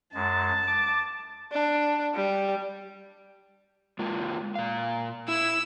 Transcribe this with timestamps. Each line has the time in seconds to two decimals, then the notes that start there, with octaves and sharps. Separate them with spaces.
0.14 F#2 G#3 A5
0.67 D6
1.52 D4
2.15 G3
3.99 G#3 A#3 F4
4.55 A#2 F5
5.28 E4 E6